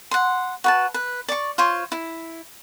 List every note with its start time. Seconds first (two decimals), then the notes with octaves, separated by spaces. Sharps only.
0.11 F#5 C6
0.64 F#4 B4 A5
0.94 B4
1.28 D5 C#6
1.58 F4 C5 C#5
1.92 E4